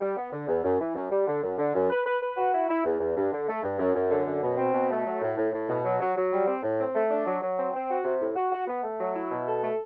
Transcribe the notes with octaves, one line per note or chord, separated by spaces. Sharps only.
G3
B3
D3
E2
F#2
E3
F#2
G3
D3
F#2
D3
F#2
B4
B4
B4
F#4
E4
E4
E2
E2
G2
D3
A3
G2
F#2
F#2
D3
F#2
B2
C4
B2
A3
F#3
A2
A2
A2
B2
F#3
F#3
F#3
G3
C4
A2
C4
A3
D4
F#3
F#3
C4
C4
F#4
C3
A2
F#4
F#4
B3
A3
F#3
E4
B2
A4
A3